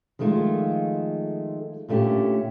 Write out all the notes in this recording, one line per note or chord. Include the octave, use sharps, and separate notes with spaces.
D#3 F3 G#3 A3 F4 A4
A#2 D3 A3 C#4 G4